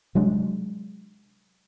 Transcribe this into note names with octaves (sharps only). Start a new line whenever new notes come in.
C3 F#3 G#3 D4